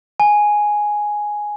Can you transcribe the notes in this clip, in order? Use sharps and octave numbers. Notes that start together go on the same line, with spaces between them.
G#5